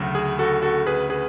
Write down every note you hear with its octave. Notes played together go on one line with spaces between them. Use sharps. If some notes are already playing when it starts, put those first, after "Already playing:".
Already playing: D2 C#3 F#3
G#4
F#4 A4
F#4 A4
G#4 B4
G#4 B4